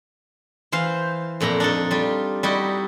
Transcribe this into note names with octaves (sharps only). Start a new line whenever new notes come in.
E3 C5 F5
F2 A#2 E4 A#5
D4 D#4 A4
G3 F4
G3 D#4 E4 F#4